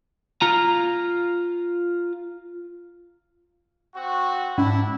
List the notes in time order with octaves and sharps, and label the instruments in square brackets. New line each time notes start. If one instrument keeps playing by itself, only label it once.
[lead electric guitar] F4 A#5
[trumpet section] C4 F#4
[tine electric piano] G#2 [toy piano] C#4 [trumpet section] D4 E4